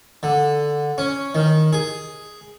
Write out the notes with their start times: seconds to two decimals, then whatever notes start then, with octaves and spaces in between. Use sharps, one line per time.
0.23 D3
0.98 C#4
1.35 D#3
1.73 G#4